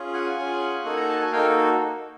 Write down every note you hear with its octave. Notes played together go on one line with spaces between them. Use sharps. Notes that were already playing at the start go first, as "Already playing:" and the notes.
Already playing: C#4 F4 G#4
F#5 G#5
C#4 F4 G#4
A#3 D#4 F#4 A4
A#5
A5
G#5
A#3 D#4 F#4 A4 F5 G5